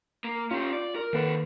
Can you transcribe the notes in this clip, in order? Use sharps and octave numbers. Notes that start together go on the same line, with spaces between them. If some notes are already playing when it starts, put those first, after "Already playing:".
A#3
C#4 F4 G4
D5
A#4
C3 D#3 A#3 A4 B4